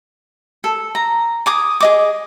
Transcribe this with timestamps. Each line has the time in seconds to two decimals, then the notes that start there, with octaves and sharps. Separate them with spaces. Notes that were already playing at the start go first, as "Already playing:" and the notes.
0.64 A4
0.95 A#5
1.46 G#5 D6 D#6
1.81 G#4 D#5 D6